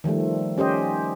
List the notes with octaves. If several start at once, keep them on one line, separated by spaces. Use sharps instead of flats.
D#3 F3 G3 A3
C#4 G4 C5 D#5